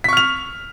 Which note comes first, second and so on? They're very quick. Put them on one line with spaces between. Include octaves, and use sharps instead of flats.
B6 C#6 F6 F7